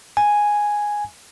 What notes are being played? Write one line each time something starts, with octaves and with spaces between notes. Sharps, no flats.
G#5